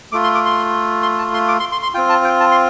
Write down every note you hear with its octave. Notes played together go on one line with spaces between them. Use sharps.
A3 F4 D6
C6
D6
C6
C6
A5
C6
D6
C6
C6
C6
C4 F4 G5
A5
G5
A5
C6